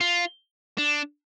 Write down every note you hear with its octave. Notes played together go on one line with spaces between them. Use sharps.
F4
D4